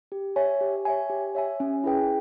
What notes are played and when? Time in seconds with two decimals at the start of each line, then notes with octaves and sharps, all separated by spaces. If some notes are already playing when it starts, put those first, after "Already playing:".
0.12 G4
0.36 C#5 E5 G#5
0.61 G4
0.85 C#5 E5 G#5
1.10 G4
1.35 C#5 E5 G#5
1.60 C#4
1.84 E4 G#4 B4 G5